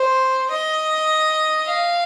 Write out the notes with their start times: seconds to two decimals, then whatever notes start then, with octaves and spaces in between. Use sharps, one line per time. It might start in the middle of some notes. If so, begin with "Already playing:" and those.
Already playing: C5
0.51 D#5
1.67 F5